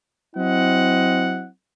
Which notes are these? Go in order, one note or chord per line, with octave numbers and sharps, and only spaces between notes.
F#3 C4 E4 D#5 F#5